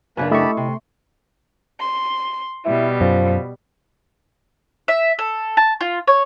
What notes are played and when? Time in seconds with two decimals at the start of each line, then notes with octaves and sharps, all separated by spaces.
0.17 F#2 C#3 A#3 D4 B4
0.31 A3 E4 G4 D#5 A5 B5 C#6
0.57 C3 C6
1.79 C6
2.65 B2 G3 E4
3.01 F#2 F3
4.88 E5
5.19 A4
5.57 A5
5.81 F4
6.08 C#5